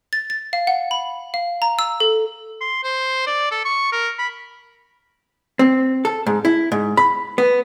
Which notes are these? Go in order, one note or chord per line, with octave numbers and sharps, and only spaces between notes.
A6
A6
F5
F#5
B5
F5
A#5
E6
A4
C6
C5
D5
A4
C#6
A#4
B5
C4
A4
G#2
E4
G#2
B5
B3